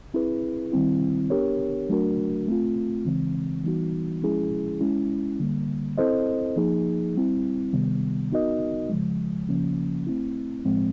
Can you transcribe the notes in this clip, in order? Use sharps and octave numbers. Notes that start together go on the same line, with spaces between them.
C4 E4 G#4 B4
D#3 G3 C4 E4
B3 D4 G4 A#4 C#5
F#3 A3 D4 F#4 A#4
A3 C4 F4
C#3 E3 G#3 C4
E3 G3 B3 D#4 F#4
F3 G#3 C#4 E4 G#4
G#3 C#4 E4
D3 G3 A#3
C4 E4 A4 C5 D#5
F3 A#3 D#4 G#4
G3 C4 E4
C3 D#3 G3 B3
B3 D#4 F#4 A#4 D#5
C#3 F3 G#3
C#3 F3 A#3 C#4
A3 C4 E4
A2 F3 G#3 C4